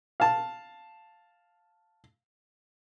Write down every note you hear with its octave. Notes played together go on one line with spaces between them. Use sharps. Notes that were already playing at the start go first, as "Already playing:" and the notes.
F5 A5